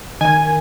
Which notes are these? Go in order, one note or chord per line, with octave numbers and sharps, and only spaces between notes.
D#3 G#5